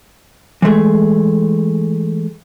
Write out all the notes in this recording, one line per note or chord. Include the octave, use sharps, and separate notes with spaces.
E3 G#3 A3 G#4